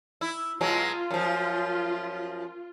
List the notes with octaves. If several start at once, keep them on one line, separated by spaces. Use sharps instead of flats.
E4
B2 F#3 G#3 F4
F#2 F3